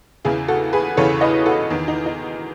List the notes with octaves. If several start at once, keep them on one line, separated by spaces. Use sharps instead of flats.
E2 C#3 E3 E4 G#4
F#4 A4
G#4 B4
E2 C#3 E3 A4 C#5
B4 D#5
F#4 A4
E2 D#3
D#4
D#4